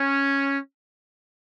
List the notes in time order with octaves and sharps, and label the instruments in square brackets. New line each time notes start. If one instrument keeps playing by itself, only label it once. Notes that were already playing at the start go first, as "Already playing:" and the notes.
Already playing: [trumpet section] C#4